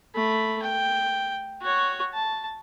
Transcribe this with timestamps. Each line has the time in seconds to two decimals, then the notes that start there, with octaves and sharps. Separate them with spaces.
0.15 A3 B5
0.62 G5
1.62 F#4 C#5
2.14 A5